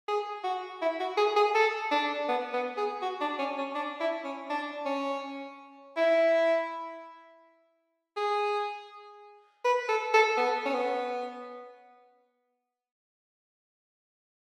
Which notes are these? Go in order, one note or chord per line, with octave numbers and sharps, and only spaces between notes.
G#4
F#4
E4
F#4
G#4
G#4
A4
D4
B3
B3
G#4
F#4
D4
C#4
C#4
D4
E4
C#4
D4
C#4
E4
G#4
B4
A4
A4
B3
C#4
B3